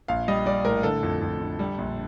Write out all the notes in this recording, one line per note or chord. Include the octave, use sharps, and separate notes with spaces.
A#1 F5
G3 D#5
G3 D5
A2 A#4
D3 A4
F2
F2
D3
G3
A#1